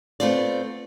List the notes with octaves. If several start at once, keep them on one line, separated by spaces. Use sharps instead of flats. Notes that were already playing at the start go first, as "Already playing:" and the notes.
A3 B3 C4 F4 D5